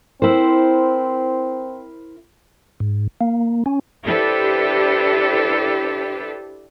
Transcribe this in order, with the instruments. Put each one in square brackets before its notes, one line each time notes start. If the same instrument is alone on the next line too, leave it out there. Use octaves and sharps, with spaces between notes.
[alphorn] C4 [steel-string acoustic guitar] E4 A#4 C5
[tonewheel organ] G#2
A#3
C#4
[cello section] D4 E4 G4 A4 B4 C5